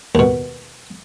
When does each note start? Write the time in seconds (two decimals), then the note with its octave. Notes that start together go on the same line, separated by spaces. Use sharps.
0.15 D#2 B2